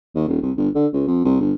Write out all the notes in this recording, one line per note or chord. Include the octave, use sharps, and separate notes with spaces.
D#2
D#1
C2
G1
D3
C#2
F2
C2
G1